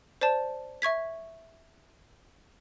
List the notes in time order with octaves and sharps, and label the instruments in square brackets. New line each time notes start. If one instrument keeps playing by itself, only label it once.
[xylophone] C5 D5 A5
E5 C#6 G#6 B6